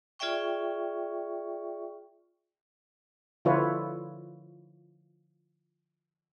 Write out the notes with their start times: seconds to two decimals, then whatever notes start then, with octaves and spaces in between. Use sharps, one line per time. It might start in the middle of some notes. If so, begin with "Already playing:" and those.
0.19 F4 G#4 D5 E5 G5 C#6
3.45 D3 F3 E4 F4 B4 C#5